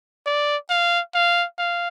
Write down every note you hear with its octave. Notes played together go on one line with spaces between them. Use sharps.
D5
F5
F5
F5